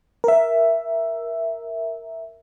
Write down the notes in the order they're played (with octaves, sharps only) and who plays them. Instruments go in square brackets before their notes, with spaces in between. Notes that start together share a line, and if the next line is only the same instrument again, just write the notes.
[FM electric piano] A#4 E5